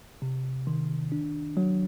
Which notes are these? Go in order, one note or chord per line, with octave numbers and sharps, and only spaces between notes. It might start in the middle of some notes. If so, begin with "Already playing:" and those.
C3
D#3
D4
F#3